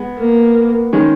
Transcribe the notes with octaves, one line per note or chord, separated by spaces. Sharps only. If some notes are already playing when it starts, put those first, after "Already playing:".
Already playing: G#3 B3
A#3
D#3 G#3 C#4